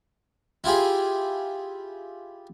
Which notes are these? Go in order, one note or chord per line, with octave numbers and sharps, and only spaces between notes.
E4 F4 G4 G#4